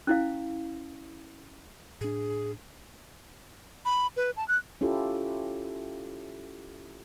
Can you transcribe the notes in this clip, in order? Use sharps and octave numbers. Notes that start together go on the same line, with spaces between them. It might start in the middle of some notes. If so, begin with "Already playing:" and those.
C#4 E4 F5
A2 D4 G#4
B5
B4
A5
F#6
C#4 E4 F4 G4 A4